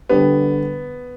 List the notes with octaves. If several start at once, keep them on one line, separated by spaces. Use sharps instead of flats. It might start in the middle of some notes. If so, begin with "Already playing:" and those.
D3 G3 B3 D4 G4